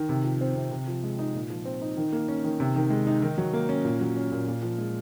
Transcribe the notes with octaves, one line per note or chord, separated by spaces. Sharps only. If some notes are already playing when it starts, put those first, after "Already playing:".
Already playing: D#3
C3
F3
C4
C3
C3
F3
G#3
D#4
A#2
F3
C4
D#4
D#3
A#3
C#4
D#3
C3
D#3
G#3
D#4
D#3
F#3
A#3
C#4
A#2
F#3
C#4
A#2
A#2
F3
G#3